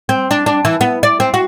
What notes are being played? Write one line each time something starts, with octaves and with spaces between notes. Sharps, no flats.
C4
D4
D4
E3
B3
D5
C4
F#4